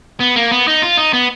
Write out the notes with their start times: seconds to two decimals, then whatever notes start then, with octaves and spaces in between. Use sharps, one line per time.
0.20 B3
0.36 A#3
0.51 B3
0.68 D#4
0.82 F4
0.97 D#4
1.13 B3